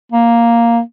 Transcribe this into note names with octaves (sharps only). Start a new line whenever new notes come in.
A#3